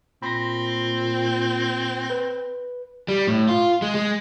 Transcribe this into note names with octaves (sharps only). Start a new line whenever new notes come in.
A#2 C4 B5 C6 A#6
B4
G3
A2
F4
G#3
G#3